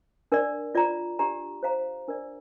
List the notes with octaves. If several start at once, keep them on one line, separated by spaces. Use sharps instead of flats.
D4 A#4 D5
F4 D5 A#5
D4 G4 D5 A#5
C5 F5 A#5
D4 A#4 D5